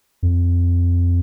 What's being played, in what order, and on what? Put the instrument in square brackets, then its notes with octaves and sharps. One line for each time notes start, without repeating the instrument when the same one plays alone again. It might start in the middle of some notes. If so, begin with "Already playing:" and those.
[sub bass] F2